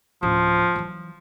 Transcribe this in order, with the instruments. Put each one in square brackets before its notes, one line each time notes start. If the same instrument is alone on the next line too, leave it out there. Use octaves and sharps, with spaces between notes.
[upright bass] D1 A1 [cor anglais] F3
[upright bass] E3 F#3